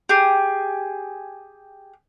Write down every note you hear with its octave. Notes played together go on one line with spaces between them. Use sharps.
G4 G#4